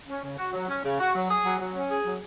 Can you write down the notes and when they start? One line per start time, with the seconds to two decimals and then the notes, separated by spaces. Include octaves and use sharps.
0.08 C#4
0.23 C#3
0.38 F#4
0.53 F#3
0.68 C#4
0.83 C#3
0.99 F#4
1.14 F#3
1.29 G#4
1.44 F#3
1.60 F#3
1.74 C#4
1.89 G#4
2.05 F#3